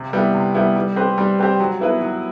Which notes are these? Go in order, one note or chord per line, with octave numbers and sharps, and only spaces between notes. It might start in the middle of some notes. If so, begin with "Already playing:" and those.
Already playing: C3
G3 B3 E4
C3
G3 B3 E4
G3
C4 G4 B4
G3
C4 G4 B4
F#3
B3 E4 B4
F#3